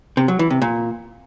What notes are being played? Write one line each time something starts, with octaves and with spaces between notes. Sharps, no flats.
C3
F#3
E3
C3
A#2